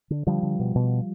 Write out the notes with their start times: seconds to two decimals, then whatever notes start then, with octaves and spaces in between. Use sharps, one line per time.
0.10 D3
0.27 D3 F3 G3
0.43 D3
0.60 B2
0.76 B2